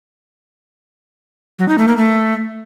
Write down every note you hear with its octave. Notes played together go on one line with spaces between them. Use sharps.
F#3
D#4
A3
A#3
A3